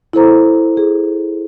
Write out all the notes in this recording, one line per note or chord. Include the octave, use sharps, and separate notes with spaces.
E4 A4 C5 A#5
G#4